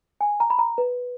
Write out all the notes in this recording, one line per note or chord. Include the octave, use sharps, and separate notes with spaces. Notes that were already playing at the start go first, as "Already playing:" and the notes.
G#5
A#5
B5
A#5
B4